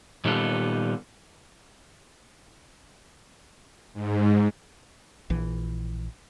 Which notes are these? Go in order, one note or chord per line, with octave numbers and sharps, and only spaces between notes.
A#2 D#3 G3 B3 F4 A4
G#2
A#1 E3